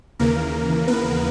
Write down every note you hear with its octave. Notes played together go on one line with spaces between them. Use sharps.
D#2 C#3 E3 A#3 A#4
B3 B4